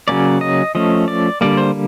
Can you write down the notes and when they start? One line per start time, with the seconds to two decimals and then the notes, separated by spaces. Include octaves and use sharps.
0.08 C#3 F#3 A#3 C#4 D5
0.41 D#5
0.75 F3 A3 C#4 D#5
1.08 D5
1.41 D3 G3 A#3 D5
1.57 C5